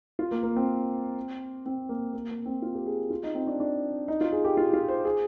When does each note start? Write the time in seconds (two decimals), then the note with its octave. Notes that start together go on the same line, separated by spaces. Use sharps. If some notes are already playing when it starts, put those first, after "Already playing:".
0.19 F4
0.31 A#3
0.43 A#3
0.56 C4
1.66 C4
1.89 A#3
2.13 A#3
2.31 A#3
2.46 C4
2.62 F4
2.75 G4
2.86 G#4
3.10 F4
3.23 D#4
3.35 C4
3.47 D4
3.60 D4
4.08 D#4
4.21 F4
4.32 G#4
4.44 G4
4.57 F4
4.73 F4
4.88 C5
5.05 G#4